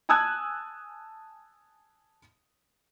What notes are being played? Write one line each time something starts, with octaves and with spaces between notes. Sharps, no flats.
G#5 A5 D#6 E6 F#6 G#6